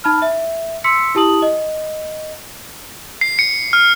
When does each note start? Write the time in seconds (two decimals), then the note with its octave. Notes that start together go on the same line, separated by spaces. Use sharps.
0.04 D#4 A5 B5 F6
0.22 E5
0.84 C6 E6 B6 C#7
1.15 E4 G4 A5 D#6 F#7
1.42 D#5
3.21 C7
3.39 C#7
3.73 F6